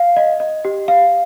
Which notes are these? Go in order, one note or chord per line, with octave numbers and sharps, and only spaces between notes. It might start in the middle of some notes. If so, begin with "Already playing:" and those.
Already playing: F5
D#5
D#5
G4
F5